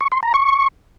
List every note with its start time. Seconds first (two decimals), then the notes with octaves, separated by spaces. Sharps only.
0.01 C#6
0.12 C6
0.23 A#5
0.34 C#6